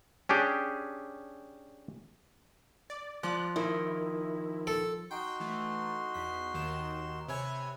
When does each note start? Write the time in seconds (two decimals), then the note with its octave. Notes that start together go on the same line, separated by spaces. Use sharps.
0.29 C#4 D4 G4 G#4
2.90 D5
3.23 F3 D5 F#6
3.56 D#3 E4
4.67 A4
5.11 D#4 F#4 G5 C6
5.40 E3 A3
6.14 E2 B6
6.54 D#2 D#3 E7
7.28 C3 B4 C#5 E5 G#5